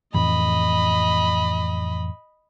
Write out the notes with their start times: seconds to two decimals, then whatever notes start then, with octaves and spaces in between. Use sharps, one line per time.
0.14 F2 A2 E3 D#5 B5